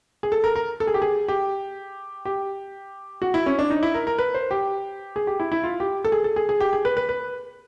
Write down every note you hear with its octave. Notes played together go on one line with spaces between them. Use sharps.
G#4
A4
A#4
A#4
A4
G#4
G4
G#4
G4
G4
F#4
E4
C#4
D4
D#4
E4
A#4
A#4
B4
C5
G4
G#4
G4
E4
E4
F4
G4
A4
G#4
A4
G#4
G#4
G4
G#4
B4
B4
B4